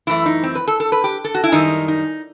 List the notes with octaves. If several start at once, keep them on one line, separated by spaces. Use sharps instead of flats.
F#2 E3 A3 E4
D#4
C4
B4
A4
A4
B4
G4
A4
F#4
E4
F#2 D#3 G3 D#4
D#4